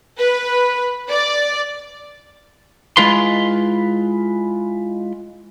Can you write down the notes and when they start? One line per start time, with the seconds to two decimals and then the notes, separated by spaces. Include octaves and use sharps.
0.18 B4
1.10 D5
2.97 G#3 E4 F4 B4 C6